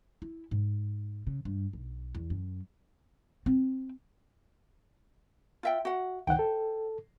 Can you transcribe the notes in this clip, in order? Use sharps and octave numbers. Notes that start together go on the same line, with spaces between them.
E4
G#2
C#3
G2
B1
E2
F#2
C4
F4 E5 G5
F#4 F#5
C#2 D#3 C5 F#5 G5
A4